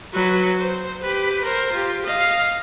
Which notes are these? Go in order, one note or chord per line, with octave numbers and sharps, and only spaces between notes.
F#3 B4
C5
G4 B4
A#4 C5
F4 G4
D#5 F5